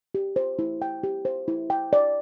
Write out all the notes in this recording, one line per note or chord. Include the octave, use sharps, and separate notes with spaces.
G4
C5
E4
G5
G4
C5
E4
G5
D5